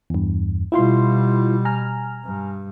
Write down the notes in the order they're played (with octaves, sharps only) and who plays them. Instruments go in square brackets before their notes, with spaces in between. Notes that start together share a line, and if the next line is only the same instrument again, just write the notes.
[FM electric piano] E2 G2
[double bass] B2 G3 [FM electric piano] E4 F4 C6
[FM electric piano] G#5 A#5 F6
[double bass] G2